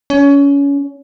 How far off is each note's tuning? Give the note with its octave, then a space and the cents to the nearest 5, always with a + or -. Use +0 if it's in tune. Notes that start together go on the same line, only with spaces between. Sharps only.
C#4 +25